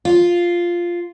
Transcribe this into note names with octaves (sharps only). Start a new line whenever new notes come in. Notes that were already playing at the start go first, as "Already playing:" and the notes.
F4